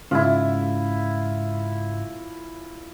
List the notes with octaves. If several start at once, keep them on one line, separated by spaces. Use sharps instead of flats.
G#2 C#3 E4 F4